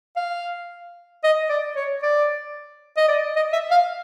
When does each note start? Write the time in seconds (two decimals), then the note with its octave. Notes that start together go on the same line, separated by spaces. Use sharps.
0.16 F5
1.24 D#5
1.49 D5
1.76 C#5
2.03 D5
2.97 D#5
3.08 D5
3.36 D#5
3.53 E5
3.71 F5